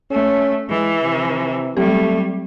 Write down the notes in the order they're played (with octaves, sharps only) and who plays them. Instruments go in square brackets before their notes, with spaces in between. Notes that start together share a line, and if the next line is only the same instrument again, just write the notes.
[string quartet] A3 [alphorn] C#4
[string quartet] E3 [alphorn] G#3
[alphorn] C3
[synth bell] F#3 C4 G4 [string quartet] G3 [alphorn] A3